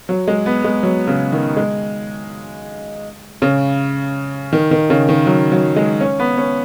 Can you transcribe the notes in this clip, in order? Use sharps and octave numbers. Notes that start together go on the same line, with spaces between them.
F#3
G#3
B3
G#3
F#3
C#3
D#3
G#3
C#3
D#3
D#3
C#3
D#3
F#3
F#3
G#3
C#4
B3
C#4